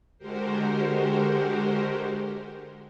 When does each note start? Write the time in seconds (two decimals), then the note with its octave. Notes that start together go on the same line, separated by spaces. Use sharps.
0.18 D3 G#3 F#4 G4 A#4 C5